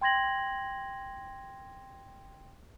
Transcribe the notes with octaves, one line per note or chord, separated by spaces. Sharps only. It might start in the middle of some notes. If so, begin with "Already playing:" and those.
G5 C6 G#6 A#6 F#7